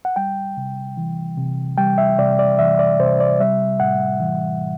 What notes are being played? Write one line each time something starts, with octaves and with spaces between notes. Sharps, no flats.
F#5
G3 G5
C3
E3
C3
G3 G5
E5
C3 D5
D5
E3 E5
D5
C3 C5
D5
G3 E5
A2 F#5
E3
A2